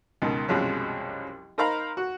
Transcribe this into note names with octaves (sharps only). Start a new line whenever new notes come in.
C#2 B2 D#3
C2 F#2 B2 F3 F#3 G#3
D#4 A#4 C5 F5 A#5 B5
F#4